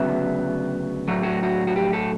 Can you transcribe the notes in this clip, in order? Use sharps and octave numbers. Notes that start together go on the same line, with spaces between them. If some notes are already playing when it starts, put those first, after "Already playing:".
Already playing: D2 C#3 F#3 B3 E5
A2 F#3 A3 F#4
F#4
F#4
F#4
G4
A4